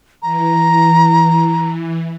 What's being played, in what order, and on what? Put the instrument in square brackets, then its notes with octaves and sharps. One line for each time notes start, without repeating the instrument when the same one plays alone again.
[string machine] E3 [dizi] A#5